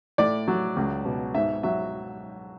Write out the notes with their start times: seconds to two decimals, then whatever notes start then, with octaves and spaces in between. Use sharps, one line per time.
0.18 A2 D5
0.48 F#3
0.76 C#2
1.05 B2
1.35 G#2 E5
1.63 F#3 E5